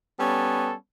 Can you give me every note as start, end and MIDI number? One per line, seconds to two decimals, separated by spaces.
0.20 0.73 55
0.20 0.73 59
0.20 0.73 61
0.20 0.73 69